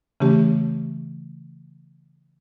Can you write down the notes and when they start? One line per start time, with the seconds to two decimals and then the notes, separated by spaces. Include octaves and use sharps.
0.20 C#3 E3 A3 C#4 G4